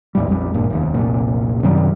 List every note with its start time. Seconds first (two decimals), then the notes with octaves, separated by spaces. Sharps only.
0.15 D#2 A2 G3
0.27 A#1 F2 G3
0.54 G#1 G2 A#2
0.70 F1 D#2
0.94 F1 C2 A#2
1.63 F#2 C3 D#3 G3